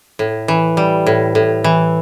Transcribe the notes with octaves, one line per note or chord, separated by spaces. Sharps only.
A2
E3
G3
A2
A2
E3